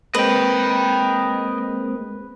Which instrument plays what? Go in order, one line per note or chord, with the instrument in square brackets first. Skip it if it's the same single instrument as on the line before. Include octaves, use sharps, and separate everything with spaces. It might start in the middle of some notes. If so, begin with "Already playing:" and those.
[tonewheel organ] G#3 A#3 C4 [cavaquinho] B4 [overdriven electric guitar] D#5 G5